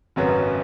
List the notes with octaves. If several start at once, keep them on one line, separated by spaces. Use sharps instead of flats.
G#1 F#2 C#3 F#3 B3